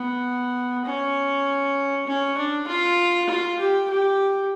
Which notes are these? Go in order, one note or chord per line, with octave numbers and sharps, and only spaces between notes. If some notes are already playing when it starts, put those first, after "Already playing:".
Already playing: B3
C#4
C#4
D4
F4
F4
G4
G4